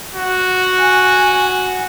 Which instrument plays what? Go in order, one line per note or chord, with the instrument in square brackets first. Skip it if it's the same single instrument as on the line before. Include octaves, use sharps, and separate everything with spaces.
[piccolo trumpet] F#4
[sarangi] G#5